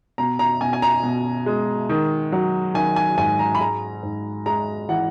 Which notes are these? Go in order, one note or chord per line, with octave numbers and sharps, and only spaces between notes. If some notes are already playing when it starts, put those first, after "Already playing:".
B2 A#5
A#5
B2 G#5
G#5
A#5
B2
G#3
D#3
F#3
D#3 G#5
G#5
G#2 G#5
A#5
B5
G#3 A#5
G#2
G#3 A#5
E3 F#5